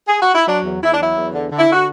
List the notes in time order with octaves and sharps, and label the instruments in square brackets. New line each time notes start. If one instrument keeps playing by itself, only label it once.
[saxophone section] G#4
F#4
E4
F#3 D4
E2
E2 E4
D4
F#3 E4
E2
D3
D3
E4
D3 F#4